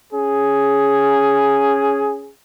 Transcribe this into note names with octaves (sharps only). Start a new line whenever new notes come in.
C#4 G#4